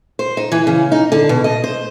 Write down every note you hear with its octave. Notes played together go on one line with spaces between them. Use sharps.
C5
D#4
E3
C#3
D#4
D3
B2
D#5
C5